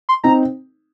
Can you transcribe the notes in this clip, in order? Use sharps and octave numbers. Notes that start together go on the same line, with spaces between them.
C6
C4 D#4 A#5